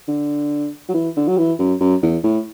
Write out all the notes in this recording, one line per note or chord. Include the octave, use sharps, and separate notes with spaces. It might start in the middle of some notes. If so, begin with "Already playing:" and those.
D3
F#3
E3
D3
F#3
E3
F#2
F#2
E2
A2